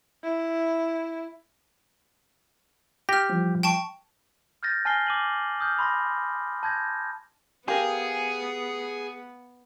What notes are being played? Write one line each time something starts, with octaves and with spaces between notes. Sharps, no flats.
E4
G4 F6 A#6
E3 F3 G3
G5 A5 C#6
F6 G6 A6 A#6
G#5 A5 F6 A#6 C7 G7
D6 D#7 F#7
D#6 F6 G6
B5 C6 A#6
A5 G6 G#6 A#6
B3 G4 G#4 A#4 F5 G#5